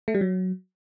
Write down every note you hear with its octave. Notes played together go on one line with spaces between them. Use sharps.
A3
G3
F#3